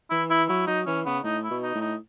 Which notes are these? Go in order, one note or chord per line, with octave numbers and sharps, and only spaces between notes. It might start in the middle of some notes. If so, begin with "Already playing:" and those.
E3 E4
E4
F#3 E4
F#3 D#4
E3 C#4
C#3 B3
A2 D#4
E4
B2
D#4
A2
D#4